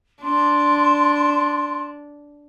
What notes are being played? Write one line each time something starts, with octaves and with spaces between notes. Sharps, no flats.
D4 C6